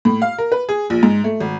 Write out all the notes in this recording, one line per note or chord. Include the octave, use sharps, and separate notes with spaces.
A2
F5
A#4
B4
G#4
A#1
G#2
A3
G#1